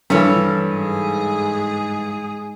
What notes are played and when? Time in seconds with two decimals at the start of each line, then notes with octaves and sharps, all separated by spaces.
0.10 G2 E3 G3 A4 C#5
0.72 G#2 G#4